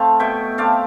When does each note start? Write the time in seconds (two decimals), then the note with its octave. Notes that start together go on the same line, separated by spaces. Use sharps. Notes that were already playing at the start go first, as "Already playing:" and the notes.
Already playing: A3 C4 F5 A5
0.19 B2 E5 G5
0.58 A3 C4 D5 F5